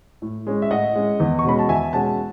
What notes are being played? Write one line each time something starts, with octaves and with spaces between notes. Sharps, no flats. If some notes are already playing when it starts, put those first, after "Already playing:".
A2
G#3 C#4
E5
A2 D#5 F#5
G#3 C#4
E2
C#6
B2 G#3 C#4 B5
A5
E2 E5 G#5
B2 G#3 C#4 F#5 A5